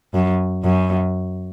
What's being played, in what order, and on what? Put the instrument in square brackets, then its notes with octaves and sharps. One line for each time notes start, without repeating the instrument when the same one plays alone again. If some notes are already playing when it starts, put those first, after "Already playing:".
[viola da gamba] F#2
F#2